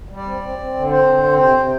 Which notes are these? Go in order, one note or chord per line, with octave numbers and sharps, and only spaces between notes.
G3
D5
C4
C4
C4
D3
C4 C5
D3
C4
C3 C5
C3